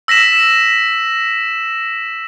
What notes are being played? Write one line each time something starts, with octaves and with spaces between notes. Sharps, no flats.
E6 A#6 B6 E7